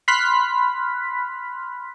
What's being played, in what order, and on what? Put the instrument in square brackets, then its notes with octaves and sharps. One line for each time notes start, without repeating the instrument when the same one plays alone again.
[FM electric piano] B5 C6 F6 F#6 B6